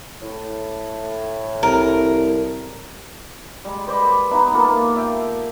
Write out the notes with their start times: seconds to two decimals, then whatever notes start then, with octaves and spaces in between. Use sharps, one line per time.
0.22 A2
1.63 C2 A#4
3.65 G3 G#3
3.87 B4 C5 D5 D#5
4.31 B3 D#4 E4
4.52 A#3 F4 A4
4.96 E5 G5